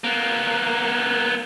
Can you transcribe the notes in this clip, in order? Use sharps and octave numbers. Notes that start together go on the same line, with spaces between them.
A#3 B3